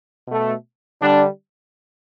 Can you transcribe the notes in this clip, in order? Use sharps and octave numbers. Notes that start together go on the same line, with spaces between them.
B2 A3
D3 G3 D4